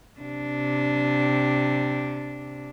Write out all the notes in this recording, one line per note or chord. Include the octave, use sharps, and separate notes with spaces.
C3 D4